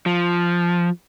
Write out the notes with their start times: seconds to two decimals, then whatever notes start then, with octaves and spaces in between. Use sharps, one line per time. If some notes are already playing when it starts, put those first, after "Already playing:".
0.06 F3